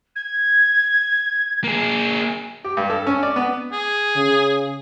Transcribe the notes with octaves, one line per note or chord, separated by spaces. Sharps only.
G#6
A#3 G#4
G4
G2
A4
C#4
D5
B3
G#4
C#3